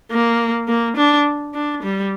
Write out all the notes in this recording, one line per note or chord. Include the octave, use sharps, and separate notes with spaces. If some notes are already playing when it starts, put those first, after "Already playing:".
A#3
A#3
D4
D4
G3